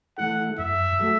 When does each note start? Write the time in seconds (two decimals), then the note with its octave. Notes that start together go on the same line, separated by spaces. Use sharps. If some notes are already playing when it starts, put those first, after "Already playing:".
0.17 E3 A3 E4 A4 F#5
0.58 F#2 E5
0.99 F#3 A3 F#4 A4